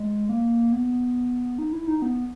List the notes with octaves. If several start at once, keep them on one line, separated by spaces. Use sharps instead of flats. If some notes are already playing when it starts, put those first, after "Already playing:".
Already playing: G#3
A#3
B3
D#4
E4
D#4
B3